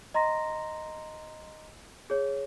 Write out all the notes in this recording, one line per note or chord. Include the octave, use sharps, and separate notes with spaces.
D#5 A#5 C6 A#6
G#4 C#5